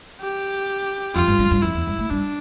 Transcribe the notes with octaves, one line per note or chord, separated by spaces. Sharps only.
G4
F2 F4
G2
G2
G2
F2 E4
E2
G2
A2
G2 D4